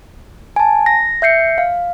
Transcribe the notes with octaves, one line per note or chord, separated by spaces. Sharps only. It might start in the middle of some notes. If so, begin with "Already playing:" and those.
G#5 A5
A#6
E5 G6 C7 C#7
F5